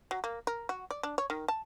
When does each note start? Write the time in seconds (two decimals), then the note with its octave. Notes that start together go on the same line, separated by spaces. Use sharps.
0.11 F#3
0.24 A#3
0.47 A#4
0.69 F#4
0.91 D5
1.03 D4
1.18 C#5
1.30 D#3
1.48 A5